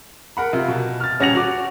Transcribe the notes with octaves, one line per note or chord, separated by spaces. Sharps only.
A#4 F#5 B5
C3 F4
B2
F6 A6
D#1 C#4 F#5 A#6 C#7 F7
F#4 D6